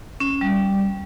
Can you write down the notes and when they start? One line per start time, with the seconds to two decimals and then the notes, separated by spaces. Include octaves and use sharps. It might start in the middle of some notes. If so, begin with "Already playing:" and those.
0.20 C#4
0.31 C#4
0.41 G3